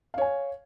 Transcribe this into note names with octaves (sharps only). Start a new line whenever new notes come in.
C#5 F5 G#5